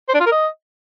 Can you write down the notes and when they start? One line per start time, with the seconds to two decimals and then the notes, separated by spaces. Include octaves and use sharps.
0.09 C5
0.14 D4
0.20 F4
0.26 A#4
0.32 D#5